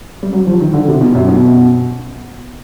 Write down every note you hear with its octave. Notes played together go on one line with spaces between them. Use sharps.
G3
F#3
F3
D#3
D3
C3
B2
F#2
B2